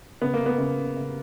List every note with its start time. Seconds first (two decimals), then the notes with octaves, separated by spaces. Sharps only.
0.22 C#3 B3
0.34 A#3
0.40 C#3
0.46 B3
0.58 C#3
0.78 C#3
0.97 C#3